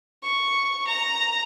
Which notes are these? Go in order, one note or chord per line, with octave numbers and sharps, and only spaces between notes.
C#6
A#5